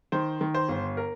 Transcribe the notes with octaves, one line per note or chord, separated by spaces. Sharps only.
D#3 C5
D#3
C5
G1
A#4